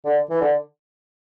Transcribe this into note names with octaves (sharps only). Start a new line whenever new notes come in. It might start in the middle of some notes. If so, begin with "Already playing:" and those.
D3
E3
D3